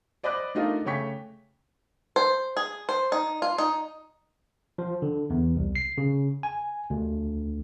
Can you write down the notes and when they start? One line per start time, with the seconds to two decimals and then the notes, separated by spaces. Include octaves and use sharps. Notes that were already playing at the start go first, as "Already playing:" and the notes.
0.23 C5 D5 D#5 B5 D6 F#6
0.55 A3 D4 D#4 F4 A#4 D#5
0.85 C#3 A3 C#5 G5 C#6 B6
2.16 C5
2.57 G#4
2.89 C5
3.12 D#4
3.42 F4
3.58 D#4
4.78 F3
5.02 D3
5.30 E2
5.56 C2
5.75 C7
5.98 C#3
6.43 G#5
6.90 D2